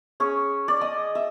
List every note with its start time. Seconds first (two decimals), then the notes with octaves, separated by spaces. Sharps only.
0.20 C#4 G#4 C#5
0.68 D5
0.81 D#5 D#6
1.15 E5